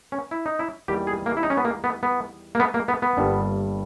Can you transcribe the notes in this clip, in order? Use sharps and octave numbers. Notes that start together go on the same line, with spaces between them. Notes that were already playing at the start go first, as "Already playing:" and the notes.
C#4
E4
D#4
E4
E2 D#3 G3 A#3 G4
G#4
A#3
E4
D#4
C#4
B3
A#3
B3
B3
A#3
B3
A#3
B3
B3
G1 G2 G3 A#3